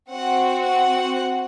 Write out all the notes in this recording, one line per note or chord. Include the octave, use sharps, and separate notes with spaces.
C4 F#4 F#5
F#5